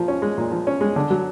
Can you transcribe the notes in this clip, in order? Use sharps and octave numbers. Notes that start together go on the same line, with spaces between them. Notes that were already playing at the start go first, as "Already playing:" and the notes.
Already playing: A#2 F3
C#4
G#3
A#2
F3
C#4
G#3
D3
F#3